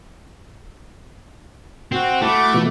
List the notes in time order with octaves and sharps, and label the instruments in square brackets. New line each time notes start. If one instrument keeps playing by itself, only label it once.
[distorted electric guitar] C4 [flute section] F#4
[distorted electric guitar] A3 [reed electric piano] E4 [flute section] F#4 B5 D6
[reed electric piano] B2 E3 F4